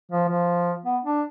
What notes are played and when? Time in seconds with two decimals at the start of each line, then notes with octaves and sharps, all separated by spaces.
0.12 F3
0.28 F3
0.85 B3
1.03 D4